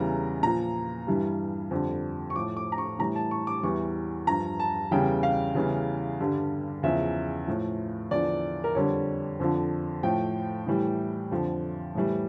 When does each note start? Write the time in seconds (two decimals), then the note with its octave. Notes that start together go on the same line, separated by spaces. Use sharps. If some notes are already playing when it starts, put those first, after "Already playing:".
Already playing: E2 C#3 E3 G3 A#5
0.43 A#2 F3 A#5
1.07 G2 E3 G3
1.71 F2 D3 G3
2.30 C#6
2.35 F3 D6
2.39 A2
2.57 D6
2.72 A#5
2.78 C#6
2.99 A2 E3 G3 A#5
3.15 A5
3.31 C#6
3.47 D6
3.63 E2 E3 G3 C#6
4.27 G2 F3 A#5
4.59 A5
4.91 E2 C#3 E3 G3 G5
5.23 F5
5.55 E2 C#3 E3 G3
6.19 G2 D3 G3
6.83 E2 C#3 F3 E5
7.47 A2 F3
8.11 E2 D3 F3 D5
8.64 A#4
8.75 F2 D3 G3 C#5
9.40 F2 D3 F3
10.03 A2 F3 G5
10.67 A2 E3 G3
11.31 F2 D3 F3
11.95 A2 E3 G3